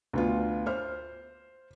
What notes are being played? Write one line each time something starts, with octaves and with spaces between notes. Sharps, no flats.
D2 B3 F4
C5 F6